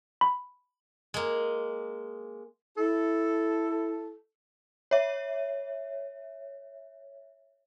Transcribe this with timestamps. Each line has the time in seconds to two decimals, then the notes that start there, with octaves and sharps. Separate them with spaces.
0.21 B5
1.14 G#3 A#3
2.77 E4 A4
4.91 C#5 E5